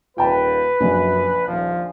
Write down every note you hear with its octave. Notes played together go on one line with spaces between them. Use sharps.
D#1 F4 B4 G5 A5
A#1 F#2 C#3 G#5
D#1 F3